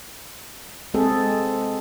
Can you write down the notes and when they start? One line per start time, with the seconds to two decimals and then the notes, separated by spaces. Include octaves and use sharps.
0.94 G#3 C4 G#4 A4